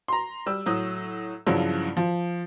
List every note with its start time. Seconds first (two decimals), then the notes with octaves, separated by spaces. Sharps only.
0.08 A#5 C6
0.46 G3 E6
0.66 A2 F#3 D#6
1.46 G2 C#3 F3 F#3 E4
1.97 F3